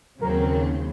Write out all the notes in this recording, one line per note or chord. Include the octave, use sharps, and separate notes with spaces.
D#2 C#3 F#3 C4 A#4
A#4